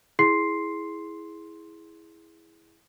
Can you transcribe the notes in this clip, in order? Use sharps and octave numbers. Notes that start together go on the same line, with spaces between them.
E4 G#4 C6 C7